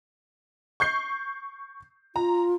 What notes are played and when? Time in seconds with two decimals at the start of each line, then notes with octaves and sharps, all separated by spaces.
0.80 C#6 G6 C7
2.16 F4 A#5